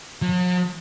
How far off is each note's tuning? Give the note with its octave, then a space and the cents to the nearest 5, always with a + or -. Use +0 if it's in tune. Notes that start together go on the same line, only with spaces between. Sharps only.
F#3 -45